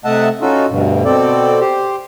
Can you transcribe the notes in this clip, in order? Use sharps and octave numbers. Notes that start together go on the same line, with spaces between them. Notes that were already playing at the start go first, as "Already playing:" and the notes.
C3 A3 D#5 E5 F#5 A5
C#4 D#4 F4 F#4 A4
D2 G2 B2
B2 C4 A4 D5
G4 C5